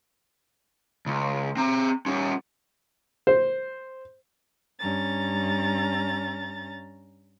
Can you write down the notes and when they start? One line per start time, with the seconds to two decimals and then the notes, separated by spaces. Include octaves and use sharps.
1.07 C#2
1.57 C4 A#5
2.06 G3 C#4
3.27 C5
4.79 G2 C#4 A#5 A6